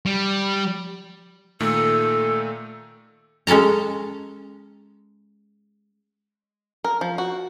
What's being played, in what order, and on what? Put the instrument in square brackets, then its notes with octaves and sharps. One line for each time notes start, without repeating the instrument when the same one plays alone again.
[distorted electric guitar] G3
[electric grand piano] A#2 D#3 A3 [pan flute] A4
[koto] G#3 C#4 A4 A5 A#5
[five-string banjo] A#4
F3
F#4